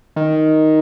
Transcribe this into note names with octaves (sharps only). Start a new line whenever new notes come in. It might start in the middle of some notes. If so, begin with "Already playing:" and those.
D#3